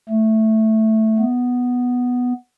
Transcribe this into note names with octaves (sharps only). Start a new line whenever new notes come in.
A3
B3